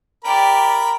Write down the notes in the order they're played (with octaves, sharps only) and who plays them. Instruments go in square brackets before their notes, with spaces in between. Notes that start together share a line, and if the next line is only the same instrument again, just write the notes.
[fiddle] G4 D5 [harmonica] A#4 A#5 B5